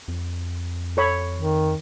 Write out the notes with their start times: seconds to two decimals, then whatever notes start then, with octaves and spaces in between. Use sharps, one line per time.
0.08 F2
0.97 A4 C#5 B5
1.36 D#3